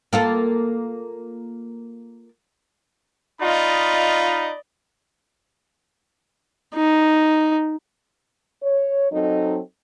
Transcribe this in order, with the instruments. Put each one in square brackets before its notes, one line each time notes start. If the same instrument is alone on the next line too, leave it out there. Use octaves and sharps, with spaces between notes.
[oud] A#3 F4 A4
[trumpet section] D#4 F4 [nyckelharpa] D5 D#5 [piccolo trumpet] B5
[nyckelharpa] D#4
[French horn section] C#5
F#3 C4 D#4 A4 D#5